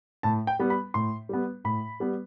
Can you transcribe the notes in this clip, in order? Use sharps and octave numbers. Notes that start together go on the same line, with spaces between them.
A2 A5
G5
G3 B3
B5
A2 C6
G3 B3
A2 B5
G3 B3